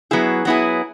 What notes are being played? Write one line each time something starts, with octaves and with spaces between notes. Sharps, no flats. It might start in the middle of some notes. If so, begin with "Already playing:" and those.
F#3 B3 E4 G#4
F#3 B3 E4 G#4